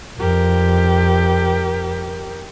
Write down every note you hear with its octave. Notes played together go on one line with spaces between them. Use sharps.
F2 G4 A#4